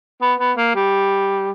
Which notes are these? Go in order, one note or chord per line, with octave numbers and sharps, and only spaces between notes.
B3
B3
A#3
G3